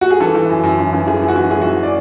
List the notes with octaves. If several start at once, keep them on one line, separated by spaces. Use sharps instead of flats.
F#4
G#4
E3 A4
E3
F#2
F#2
E3
E3
E3 G#4
F#2
F#4
E3
E3 G#4
E3 F#4
D5